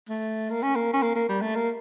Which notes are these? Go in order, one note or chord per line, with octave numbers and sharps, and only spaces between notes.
A3
A#3
C#4
A#3
C#4
A#3
A#3
G3
A3
A#3